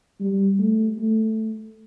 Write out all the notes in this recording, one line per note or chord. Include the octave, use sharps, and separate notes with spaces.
G3
A3
A3